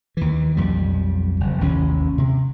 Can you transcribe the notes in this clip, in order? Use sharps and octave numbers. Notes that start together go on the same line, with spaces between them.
D#2 E3
B1 F2 G3
F#1
A1 D#2 C3 C#4
C3